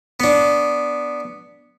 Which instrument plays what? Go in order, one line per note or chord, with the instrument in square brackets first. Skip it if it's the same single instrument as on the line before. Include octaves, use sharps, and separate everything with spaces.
[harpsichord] B3 D4